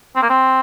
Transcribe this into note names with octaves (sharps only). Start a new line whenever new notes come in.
C4
A#3
C4